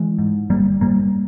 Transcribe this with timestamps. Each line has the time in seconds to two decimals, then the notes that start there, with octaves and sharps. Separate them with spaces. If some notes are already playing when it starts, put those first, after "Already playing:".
Already playing: E3 G#3
0.19 G#2
0.50 G1 G3 A#3
0.81 G2 G3 A#3